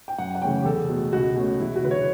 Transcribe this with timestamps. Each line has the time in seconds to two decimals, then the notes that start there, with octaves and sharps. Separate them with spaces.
0.08 G5
0.18 F#2 F#5
0.35 F#5
0.42 C#3 E3 A3 C#4 G5
0.61 G4
0.65 E2 A4
0.89 B2 A3
1.12 C#2 F#4
1.36 B2 A3 C#4 F#4
1.60 E2 E4
1.76 F#4
1.83 D3 F#3 B4
1.91 C#5